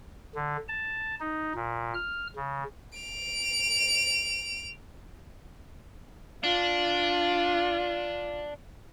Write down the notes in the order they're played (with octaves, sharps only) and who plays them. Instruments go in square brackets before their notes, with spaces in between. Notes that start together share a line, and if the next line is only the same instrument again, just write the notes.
[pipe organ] D3
A5
D#4
A#2
F6
C#3
[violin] D7 F7
[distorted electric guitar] D4 [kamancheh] F4